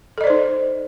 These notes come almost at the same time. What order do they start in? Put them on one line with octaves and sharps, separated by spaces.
A4 D#5 D5 C5 D#4